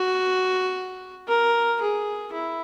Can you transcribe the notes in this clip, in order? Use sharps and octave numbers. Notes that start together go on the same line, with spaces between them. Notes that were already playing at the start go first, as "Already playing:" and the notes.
Already playing: F#4
A#4
G#4
E4